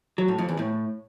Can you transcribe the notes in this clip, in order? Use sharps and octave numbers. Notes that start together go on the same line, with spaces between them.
F#3
A2
F2
E2
A2